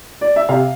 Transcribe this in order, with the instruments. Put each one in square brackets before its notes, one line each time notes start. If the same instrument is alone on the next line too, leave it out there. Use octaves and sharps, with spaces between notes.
[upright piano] D5
E5
C3 F5